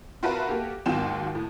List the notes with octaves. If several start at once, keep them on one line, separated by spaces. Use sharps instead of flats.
F4 F#4 A#4 B4 E5 A5
A#3 F#4 G4 A4
D#2 G#2 F#3 F4 G5 E7
A2